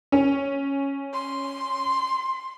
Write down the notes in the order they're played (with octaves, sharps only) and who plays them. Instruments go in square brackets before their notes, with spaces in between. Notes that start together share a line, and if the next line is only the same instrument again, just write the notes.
[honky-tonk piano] C#4
[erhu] C6